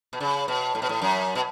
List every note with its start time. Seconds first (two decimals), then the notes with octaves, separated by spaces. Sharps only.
0.13 B2
0.20 C#3
0.48 B2
0.75 A2
0.82 B2
0.89 A2
1.02 F#2
1.35 B2